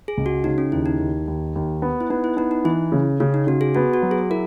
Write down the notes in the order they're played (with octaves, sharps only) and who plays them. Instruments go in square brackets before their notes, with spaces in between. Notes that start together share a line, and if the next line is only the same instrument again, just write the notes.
[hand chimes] G#4
[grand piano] C#2
[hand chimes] F#4
[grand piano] C#3 [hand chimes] D#4
[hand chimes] C#4
[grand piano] D#2 [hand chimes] E4
[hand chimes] D#4
[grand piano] D#2
D#2
D#2
B3
[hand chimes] E4
[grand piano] B3 [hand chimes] D#4
[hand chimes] E4
[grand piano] B3 [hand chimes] D#4
[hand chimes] D#4
[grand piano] E3 [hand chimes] E4
[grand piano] C#3
[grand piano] C#3 [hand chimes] C#4
[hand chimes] D#4
[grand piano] C#3 [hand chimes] F#4
[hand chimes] G#4
[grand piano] B3 [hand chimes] F#4
[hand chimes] F#4
[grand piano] F#3
[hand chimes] G#4
[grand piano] E4 [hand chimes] A#4